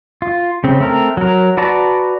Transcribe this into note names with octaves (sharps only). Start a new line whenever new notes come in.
F4
C#3 C4
A3 C4 A#4
F#3 A#4
F#4 B4 D5 A5 A#5